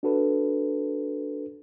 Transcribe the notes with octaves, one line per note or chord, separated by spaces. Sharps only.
D4 F#4 A4 B4